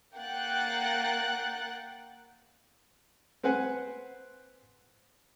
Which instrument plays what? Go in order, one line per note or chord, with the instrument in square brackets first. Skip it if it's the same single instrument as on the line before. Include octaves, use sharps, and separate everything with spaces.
[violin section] A#3 F#5 G5 F#6 A6
[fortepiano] C4 B4 C5 F#5 G#5